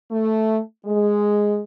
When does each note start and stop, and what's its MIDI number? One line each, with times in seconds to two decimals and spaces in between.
0.11 0.59 57
0.86 1.61 56